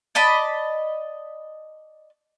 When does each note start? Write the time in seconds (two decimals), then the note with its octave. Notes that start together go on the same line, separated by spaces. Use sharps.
0.15 D5 D#5 A5 B5